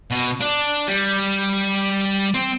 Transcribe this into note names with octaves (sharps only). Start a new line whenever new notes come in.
B2
D4
G3
C4